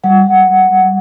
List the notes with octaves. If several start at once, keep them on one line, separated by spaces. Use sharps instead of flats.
G3 F#5